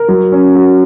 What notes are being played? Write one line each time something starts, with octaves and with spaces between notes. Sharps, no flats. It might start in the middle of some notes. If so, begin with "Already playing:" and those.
Already playing: A#4
F#3
C#4
F#4